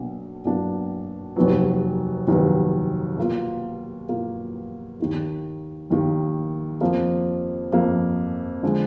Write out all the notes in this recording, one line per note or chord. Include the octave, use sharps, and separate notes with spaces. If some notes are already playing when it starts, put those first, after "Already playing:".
Already playing: B1 B2 A#3 D4
B1 B2 A#3 D4 F#4
F1 D#2 D#3 F#3 B3
F1 D#2 D#3 F#3 B3
B2 A#3 F4
B2 A#3 F4
D#2 D#3 A#3
D#2 D#3 A#3
F2 F3 A#3
F2 F3 A#3
D3 F3 G#3